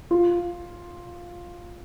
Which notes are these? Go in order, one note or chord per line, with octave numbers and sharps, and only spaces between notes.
F4